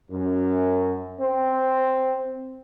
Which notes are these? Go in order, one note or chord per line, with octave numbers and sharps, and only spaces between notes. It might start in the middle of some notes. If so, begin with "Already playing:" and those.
F#2
C4